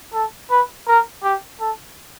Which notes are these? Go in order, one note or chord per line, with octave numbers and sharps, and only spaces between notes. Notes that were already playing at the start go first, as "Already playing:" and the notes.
A4
B4
A#4
G4
A4